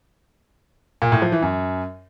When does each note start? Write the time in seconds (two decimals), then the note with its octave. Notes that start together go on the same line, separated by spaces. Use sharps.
1.02 A#2
1.12 A2
1.22 F3
1.32 E3
1.42 F#2